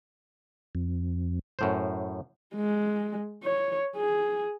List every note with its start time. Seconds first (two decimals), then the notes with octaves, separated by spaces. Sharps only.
0.75 F2
1.59 F#2 A2 C5
2.55 G#3
3.43 C#5
3.97 G#4